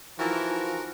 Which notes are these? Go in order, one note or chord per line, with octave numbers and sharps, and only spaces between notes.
E3 F3 D#4 F4 F#4 A#4